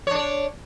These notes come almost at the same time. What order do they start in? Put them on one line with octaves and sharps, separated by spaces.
C#5 D4 D5